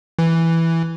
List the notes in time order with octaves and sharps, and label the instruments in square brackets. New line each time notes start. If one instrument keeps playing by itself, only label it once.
[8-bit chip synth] E3